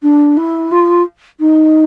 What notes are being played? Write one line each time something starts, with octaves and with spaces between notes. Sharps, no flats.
D4
E4
F4
D#4